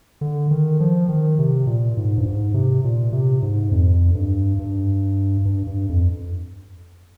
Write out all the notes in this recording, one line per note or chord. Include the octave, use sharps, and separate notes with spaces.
D3
D#3
F3
D#3
C3
A#2
G#2
G2
G#2
C3
A#2
C3
G#2
F2
G2
G2
G2
G2
F2